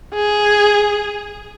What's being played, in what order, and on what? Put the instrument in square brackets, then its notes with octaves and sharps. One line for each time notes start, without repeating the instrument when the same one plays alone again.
[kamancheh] G#4